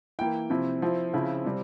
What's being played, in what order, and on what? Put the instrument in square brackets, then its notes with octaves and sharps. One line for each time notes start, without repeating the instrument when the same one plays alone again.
[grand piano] E3 A#3 E4 G5
C3 F3 C4 E4
F3 C4 E4
C#3 F3 C4 E4
C3 G3 C4